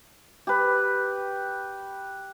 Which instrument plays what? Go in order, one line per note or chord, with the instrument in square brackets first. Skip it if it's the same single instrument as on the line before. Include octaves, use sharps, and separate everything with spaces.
[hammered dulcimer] G4 B4